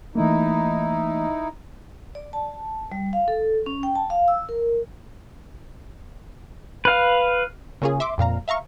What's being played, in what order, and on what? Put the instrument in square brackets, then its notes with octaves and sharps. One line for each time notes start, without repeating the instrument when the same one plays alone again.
[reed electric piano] E3 A3 A#3 [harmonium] D#4 E4
[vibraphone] D5
A5
G3
F5
A4
C#4
G5
A5
F5
E6
A#4
[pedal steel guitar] B4 F5
[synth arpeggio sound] C#3 A#3 C#4 F4 G#4
E5 C6 D6
F2 A#2 F5 A#5
E5 F5 A#5 C#6